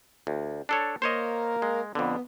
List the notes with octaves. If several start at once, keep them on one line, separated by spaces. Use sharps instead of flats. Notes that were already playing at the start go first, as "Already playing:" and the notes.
D2
D4 A4 C#5
A#3 A#4 C5 C#5 D#5
G#3
F2 D3 B3